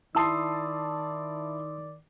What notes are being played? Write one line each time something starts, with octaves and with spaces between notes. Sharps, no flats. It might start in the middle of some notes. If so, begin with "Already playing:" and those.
D#3 E4 D5 A5 C6 D#6 E6 C7